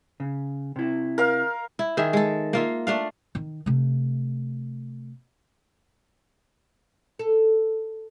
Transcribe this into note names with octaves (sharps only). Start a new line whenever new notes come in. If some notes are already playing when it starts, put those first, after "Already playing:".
C#3
C3 E4
A#4 F5
E4
D#3 G#4 E5
G#3 A4
A#3 F4 E5
A3 D4 F5
D#3
C3 A3
A4